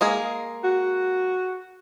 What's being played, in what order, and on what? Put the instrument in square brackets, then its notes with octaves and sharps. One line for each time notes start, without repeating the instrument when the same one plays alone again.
[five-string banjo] G#3 A#3 G#4
[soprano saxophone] F#4